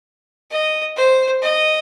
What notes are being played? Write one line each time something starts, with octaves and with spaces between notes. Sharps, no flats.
D#5
C5
D#5